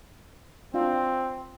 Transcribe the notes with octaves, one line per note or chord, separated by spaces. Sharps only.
C4 D4 F4 F5